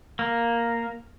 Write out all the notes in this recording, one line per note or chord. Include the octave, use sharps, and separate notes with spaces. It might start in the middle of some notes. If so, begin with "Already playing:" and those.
A#3